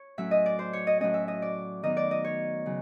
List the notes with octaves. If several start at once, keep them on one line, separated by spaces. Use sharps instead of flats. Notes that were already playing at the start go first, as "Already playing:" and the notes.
Already playing: C#5
A2 F#3 A3 C#4 E5
D#5
D5
C5
C#5
D#5
A2 F#3 A3 C#4 D#5
E5
D#5
D5
D#3 F#3 B3 D#4 D#5
D5
D#5
C#5
C#3 F#3